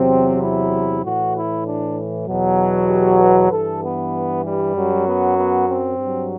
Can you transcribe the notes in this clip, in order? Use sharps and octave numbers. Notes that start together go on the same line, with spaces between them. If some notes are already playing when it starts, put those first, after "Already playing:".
Already playing: E2 C3 F#3 C4
E4
A2 E3 F#4
E4
D4
E2 B2 F#3
G4
B4
G2 E3 A4
B3
G3
F#2 F#3
B3
B3
C4
G2 F#3